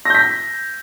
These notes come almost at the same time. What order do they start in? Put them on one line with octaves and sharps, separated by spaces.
A#6 G6 B6